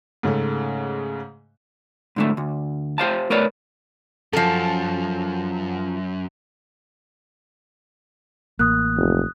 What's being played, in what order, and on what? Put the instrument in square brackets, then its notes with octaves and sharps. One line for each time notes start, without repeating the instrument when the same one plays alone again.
[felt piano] G#2 C#3 G#3 A3
[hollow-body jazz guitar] G#2 D3 A3
D2
G4 C5 F5 A5
A3 A#4 B4 C#5 D5
[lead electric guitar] F#2 [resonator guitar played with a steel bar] F3 A4
[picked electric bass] A1 [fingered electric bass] A#3 [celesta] D#6 F#6
[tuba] F1